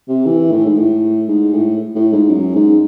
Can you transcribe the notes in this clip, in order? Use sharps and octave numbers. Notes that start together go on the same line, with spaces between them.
C3
E3
A2
G#2
A2
G#2
A2
A2
G#2
F#2
G#2